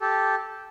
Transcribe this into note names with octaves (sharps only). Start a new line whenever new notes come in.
G4 A4